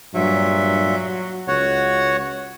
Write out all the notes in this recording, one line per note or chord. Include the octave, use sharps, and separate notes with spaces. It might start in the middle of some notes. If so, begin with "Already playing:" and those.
G2 A#2 F#3 E5
C#2 F#4 C#5 F#5